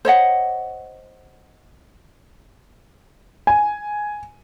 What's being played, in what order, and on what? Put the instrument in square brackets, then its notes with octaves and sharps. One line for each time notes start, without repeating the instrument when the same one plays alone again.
[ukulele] C5 C#5 D#5 F#5
[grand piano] G#5